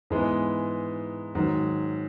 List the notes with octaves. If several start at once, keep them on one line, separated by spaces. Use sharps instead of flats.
G#2 E3 G#3 B3
G#2 D#3 F#3